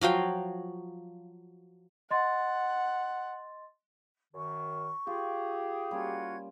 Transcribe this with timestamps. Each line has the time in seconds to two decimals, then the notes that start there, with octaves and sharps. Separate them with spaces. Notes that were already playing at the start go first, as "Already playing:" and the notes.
0.01 F3 F#3 F5 G5
2.11 D#5 F#5 C6 A6
4.33 F#2 D#3 C#6
5.07 F4 G4 G#4
5.91 G3 A#3 C#4 F4 F#4 G#6